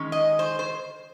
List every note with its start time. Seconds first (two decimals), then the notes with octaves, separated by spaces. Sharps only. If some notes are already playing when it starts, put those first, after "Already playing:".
Already playing: D#3 G#3 C#4
0.12 D#5
0.39 C5
0.59 C5